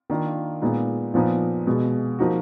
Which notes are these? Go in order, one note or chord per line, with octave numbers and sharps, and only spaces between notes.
D#3 A#3 D4 F4
A#2 G#3 B3 D#4
A#2 F3 B3 D#4
B2 G#3 B3
F3 A#3 D#4 F#4